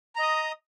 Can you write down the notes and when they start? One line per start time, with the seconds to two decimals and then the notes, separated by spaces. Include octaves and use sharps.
0.16 A#5
0.19 D#5
0.23 D#6